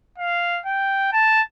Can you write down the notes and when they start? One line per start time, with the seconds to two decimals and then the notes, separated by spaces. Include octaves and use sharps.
0.18 F5
0.66 G5
1.13 A5